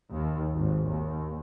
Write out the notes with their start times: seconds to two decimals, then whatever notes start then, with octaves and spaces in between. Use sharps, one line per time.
0.11 D#2
0.54 G#1
0.89 D#2